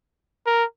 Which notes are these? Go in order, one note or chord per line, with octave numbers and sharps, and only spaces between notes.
A#4